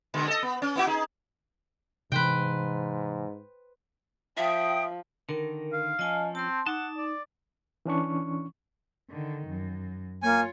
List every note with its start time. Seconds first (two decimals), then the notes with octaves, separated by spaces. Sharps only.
0.14 B2 D3 G#3
0.28 A4 D#5
0.42 B3
0.62 C#4
0.76 B3 E4 F#4
0.87 D#4 G#4
2.12 G#2 C3 E3 B4 C5 G5
4.37 F3 E5 G5 D#6
5.29 D3 D#3 A#4
5.73 F5
5.99 F3 C#4 D#5 G#5 A5
6.35 C4 A5 C6
6.66 D#4 F#5 A5 D6
6.97 D5
7.86 E3 C#4 D4 C#6
9.10 D3 D#3
9.47 F#2
10.23 A#3 F4 C#5 G#5